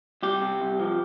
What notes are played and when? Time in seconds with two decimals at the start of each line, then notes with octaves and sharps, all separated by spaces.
0.23 C2 G4
0.42 C3
0.61 C2
0.79 F3